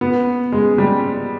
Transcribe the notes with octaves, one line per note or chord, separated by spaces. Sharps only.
B3
G#3
G3